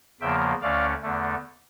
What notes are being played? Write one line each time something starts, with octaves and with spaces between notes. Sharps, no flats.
E2 C#3 F3 A#3 E5 G5
D2 D3 A3 C#4 D5 F5
E2 D3 A3